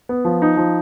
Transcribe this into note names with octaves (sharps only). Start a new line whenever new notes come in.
B3
F3
D#4
F3